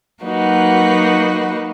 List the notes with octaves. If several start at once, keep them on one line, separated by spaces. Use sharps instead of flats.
F#3 A#3 D#4 F#4 B4